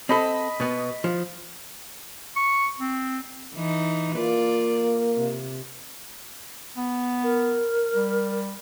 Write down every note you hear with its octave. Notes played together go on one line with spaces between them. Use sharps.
C4 A4 D#5 B5
B2 B3
F3
C#6
C4
E3 D#4
A#3 F4 D5
C3
B3
A#4
G3